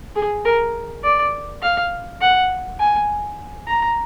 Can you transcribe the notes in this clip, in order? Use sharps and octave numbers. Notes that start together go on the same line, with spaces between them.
G#4
A#4
D5
F5
F#5
G#5
A#5